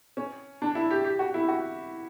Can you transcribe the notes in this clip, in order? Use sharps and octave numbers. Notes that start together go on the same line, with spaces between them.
C#4
D4
E4
G4
G4
F#4
E4
F#4